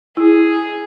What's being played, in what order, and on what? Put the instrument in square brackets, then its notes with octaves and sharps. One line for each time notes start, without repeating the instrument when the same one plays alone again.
[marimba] E4 [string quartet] G#4